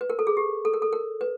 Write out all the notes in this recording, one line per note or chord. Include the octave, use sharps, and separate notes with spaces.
B4
A#4
A4
G#4
G4
A4
A#4
A4
A#4
B4